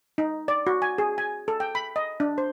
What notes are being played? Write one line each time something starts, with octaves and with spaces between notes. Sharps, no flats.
D#4
D5
F#4
G#5
G#4
G#5
A4
G5
B5
D#5
D4
C5